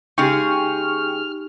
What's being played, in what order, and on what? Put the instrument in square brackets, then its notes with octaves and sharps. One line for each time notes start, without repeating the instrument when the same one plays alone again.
[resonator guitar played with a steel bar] C#3 G#3 G#4 [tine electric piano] D#4 G4 [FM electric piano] G5 C#6 [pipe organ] F6